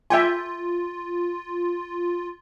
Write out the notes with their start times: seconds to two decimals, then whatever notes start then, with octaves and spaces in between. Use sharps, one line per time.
0.10 F4 E5 G5 G#5